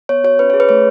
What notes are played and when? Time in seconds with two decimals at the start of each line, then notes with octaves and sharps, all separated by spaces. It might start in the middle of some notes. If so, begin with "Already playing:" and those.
0.09 B3 C#5
0.24 F#4 C#5
0.39 C#4 B4
0.50 G#4 C#5
0.60 B4
0.69 A3 C#5